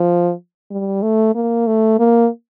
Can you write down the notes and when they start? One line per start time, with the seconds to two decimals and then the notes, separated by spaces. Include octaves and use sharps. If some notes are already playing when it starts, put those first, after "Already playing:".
Already playing: F3
0.71 G3
1.03 A3
1.35 A#3
1.67 A3
1.99 A#3